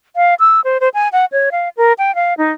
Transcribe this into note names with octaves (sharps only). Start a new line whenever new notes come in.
F5
E6
C5
C5
G#5
F#5
C#5
F5
A#4
G5
F5
D#4